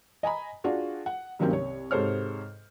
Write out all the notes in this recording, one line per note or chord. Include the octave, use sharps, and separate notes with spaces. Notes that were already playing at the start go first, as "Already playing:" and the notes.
D#5 G#5 A#5 B5
D4 F4 F#4 G#4
F#5
G2 D#3 F#3 A#3 C4 C#4
C2 C#5
G#2 C3 A4 C5 C#5 F6